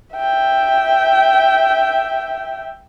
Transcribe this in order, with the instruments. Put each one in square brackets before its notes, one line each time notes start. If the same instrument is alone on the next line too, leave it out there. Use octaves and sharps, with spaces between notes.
[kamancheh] E5 G5